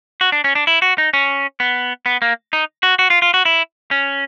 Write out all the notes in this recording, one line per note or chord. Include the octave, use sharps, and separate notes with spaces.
F#4
D4
C#4
D4
E4
F#4
D#4
C#4
B3
B3
A#3
D#4
F#4
F#4
F4
F4
F#4
E4
C#4